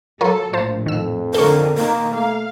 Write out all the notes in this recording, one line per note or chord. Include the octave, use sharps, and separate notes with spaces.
F#3 F4 A4 A#4 C#5
A#1 A2 F4 C5 A5
F2 D#3 E6
D3 D#3 A4 A#4 C#6
B2 D#3 A#3
A3 F5